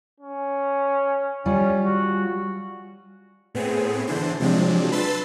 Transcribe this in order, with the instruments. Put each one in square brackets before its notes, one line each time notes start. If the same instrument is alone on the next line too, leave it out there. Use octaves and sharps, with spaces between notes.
[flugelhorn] C#4
[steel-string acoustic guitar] G3 F4 [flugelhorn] C#4
[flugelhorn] F#4
[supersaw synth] A2 B3 C4 G#4
D3 E3 D4 C5
C3 F3 F#3 G#3 C4 D4
B4 A5 B5 C6 E6 A6